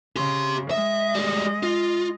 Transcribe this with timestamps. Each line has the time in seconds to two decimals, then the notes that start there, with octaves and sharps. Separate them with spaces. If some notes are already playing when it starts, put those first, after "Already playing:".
0.16 C#3 G4 C6
0.71 G#3 D#5 E5
1.15 G3 G#4
1.63 F4